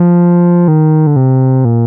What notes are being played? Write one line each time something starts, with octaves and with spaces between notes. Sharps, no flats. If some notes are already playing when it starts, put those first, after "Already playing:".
Already playing: F3
D#3
D3
C3
A#2